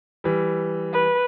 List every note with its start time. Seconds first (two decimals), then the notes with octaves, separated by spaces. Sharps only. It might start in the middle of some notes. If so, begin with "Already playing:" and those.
0.24 E3 G3
0.93 B4